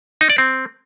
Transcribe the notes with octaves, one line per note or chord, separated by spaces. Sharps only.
D#4
D5
C4